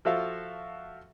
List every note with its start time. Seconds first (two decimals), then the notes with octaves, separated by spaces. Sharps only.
0.05 F3 F#4 A4 E5 F5